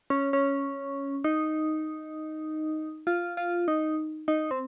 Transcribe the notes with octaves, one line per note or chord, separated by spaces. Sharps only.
C#4
C#4
D#4
F4
F4
D#4
D#4
C4